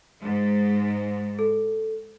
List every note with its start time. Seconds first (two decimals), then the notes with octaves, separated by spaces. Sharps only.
0.21 G#2
1.39 A4